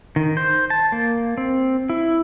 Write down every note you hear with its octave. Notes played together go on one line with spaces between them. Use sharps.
D#3
C5
A5
A#3
C4
E4